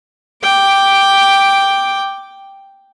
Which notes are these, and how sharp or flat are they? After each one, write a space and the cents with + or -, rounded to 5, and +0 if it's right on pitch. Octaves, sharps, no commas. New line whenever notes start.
G5 +0 D6 +0